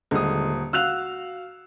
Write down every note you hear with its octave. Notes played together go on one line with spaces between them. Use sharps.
D#1 D3 G#3 D#6
F#4 F5 E6 F#6 F7